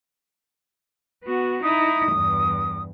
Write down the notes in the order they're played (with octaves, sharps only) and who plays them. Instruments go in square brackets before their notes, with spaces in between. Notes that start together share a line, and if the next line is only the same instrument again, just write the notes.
[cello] B3 F#4
[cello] D#4 E4 [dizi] D#6
[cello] E2 G2